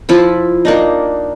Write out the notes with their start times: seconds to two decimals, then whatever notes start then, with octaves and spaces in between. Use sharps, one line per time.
0.09 F3 E4 B5
0.65 A#3 D4 D#4